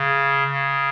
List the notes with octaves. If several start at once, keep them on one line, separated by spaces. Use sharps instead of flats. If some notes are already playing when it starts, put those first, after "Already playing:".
Already playing: C#3
C#3